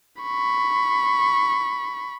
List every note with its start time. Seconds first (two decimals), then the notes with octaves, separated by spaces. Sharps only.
0.23 B5 C#6